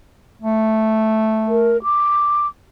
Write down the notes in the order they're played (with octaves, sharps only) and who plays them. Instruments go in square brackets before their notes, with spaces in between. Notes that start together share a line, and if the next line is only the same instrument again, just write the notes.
[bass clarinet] A3
[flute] A#4
D6